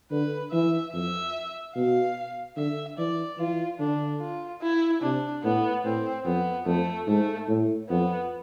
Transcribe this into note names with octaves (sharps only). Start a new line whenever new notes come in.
D3 B4
E3 E5
F2 E5
B2 F5
D3 E5
E3 D5
E3 F4
D3 D4
F4
E4
C3 D4
A2 B3
A2 C4
F2 B3
F2 A3
G#2 A3
A2
F2 B3